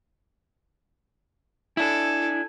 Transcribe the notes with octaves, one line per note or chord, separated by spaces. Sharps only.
D4 E4 A4 G#5